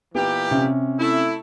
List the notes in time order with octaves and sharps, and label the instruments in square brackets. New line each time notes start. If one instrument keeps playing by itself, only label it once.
[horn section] A#2 E3 G4 [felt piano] B3
[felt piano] C3 C#4
[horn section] A3 E4